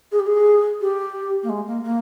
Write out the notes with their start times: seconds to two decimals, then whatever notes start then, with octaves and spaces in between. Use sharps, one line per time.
0.11 G#4
0.19 G4
0.26 G#4
0.81 G4
1.43 A#3
1.49 G#3
1.66 A#3
1.83 A#3